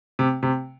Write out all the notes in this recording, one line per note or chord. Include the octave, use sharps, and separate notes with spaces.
C3
C3